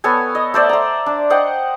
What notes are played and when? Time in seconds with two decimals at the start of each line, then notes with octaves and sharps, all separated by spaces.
0.04 B3 A4 C#5 G#5
0.35 D#5
0.54 A3 C5 D5 E5
0.69 A#5 C6
1.06 D4
1.30 C5 D#5 F#5 G5